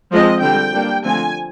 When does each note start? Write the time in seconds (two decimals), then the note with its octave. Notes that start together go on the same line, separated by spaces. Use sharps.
0.11 F3 G#3 C4 D#5
0.42 D3 G3 C4 G5
0.73 G3 A#3 D4
1.03 D3 F3 A3 C4 G#5